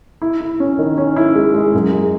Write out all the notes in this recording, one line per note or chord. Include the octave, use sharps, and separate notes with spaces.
E4
E4
C#4
D#3
C#4
E4
G#3
G#3
F#2
G#3